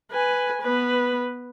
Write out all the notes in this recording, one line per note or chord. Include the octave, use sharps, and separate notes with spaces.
B4 G#5
B3 B4